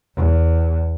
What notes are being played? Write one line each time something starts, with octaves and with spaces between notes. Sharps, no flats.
E2